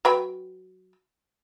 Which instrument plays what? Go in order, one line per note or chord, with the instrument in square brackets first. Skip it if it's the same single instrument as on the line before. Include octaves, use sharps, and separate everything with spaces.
[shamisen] F#3 B4 G5